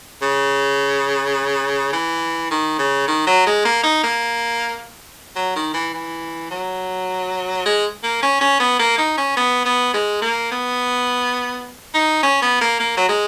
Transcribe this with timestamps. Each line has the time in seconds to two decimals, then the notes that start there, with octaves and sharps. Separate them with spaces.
0.22 C#3
1.93 E3
2.51 D#3
2.79 C#3
3.08 D#3
3.27 F#3
3.46 G#3
3.65 A#3
3.83 D#4
4.04 A#3
5.36 F#3
5.56 D#3
5.74 E3
5.94 E3
6.50 F#3
7.66 G#3
8.03 A#3
8.23 C#4
8.41 C#4
8.60 B3
8.79 A#3
8.98 D#4
9.17 C#4
9.37 B3
9.65 B3
9.93 G#3
10.22 A#3
10.51 B3
11.94 D#4
12.23 C#4
12.42 B3
12.61 A#3
12.80 A#3
12.97 F#3
13.09 G#3